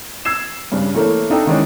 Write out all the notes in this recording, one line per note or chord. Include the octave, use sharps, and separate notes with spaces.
E6 G#6 C7 E7
G2 C#3 D4
E3 A3 A#3 A4 C#5
D4 D#4 A4 G5
D#3 E3 G#3 C#4 D5